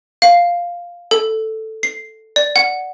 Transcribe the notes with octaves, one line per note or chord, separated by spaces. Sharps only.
F5
A4
C7
D5
F#5